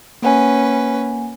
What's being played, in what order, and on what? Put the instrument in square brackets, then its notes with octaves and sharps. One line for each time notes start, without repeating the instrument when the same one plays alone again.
[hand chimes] A#3 F#5 G#5 [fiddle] C#4 B4